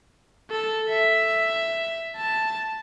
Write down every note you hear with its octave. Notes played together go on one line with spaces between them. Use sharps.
A4
E5
A5